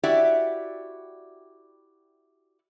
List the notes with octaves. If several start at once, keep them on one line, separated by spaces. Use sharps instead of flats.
E4 F#4 G4 D5 E5